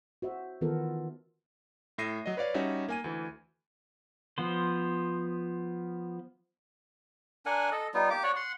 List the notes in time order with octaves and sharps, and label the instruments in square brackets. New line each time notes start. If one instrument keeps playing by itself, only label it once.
[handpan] F#4 C5 E5
D#3 E3 B3 F4 A4 A#4
[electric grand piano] A2 E5 A#6 C7 D#7
F#3 D#5
B4 C#5 D5 F5
G3 C#4 D#4 F#4 E5
A#3 G#5 D#7
D2 E3
[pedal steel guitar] F3 B3 C5
[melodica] D4 A#4 F#5 G#5
A4 D#5
G3 B3 D#4 F4
A#3 G4 D6
F#4 C#5 D5 F#5
F#5 C6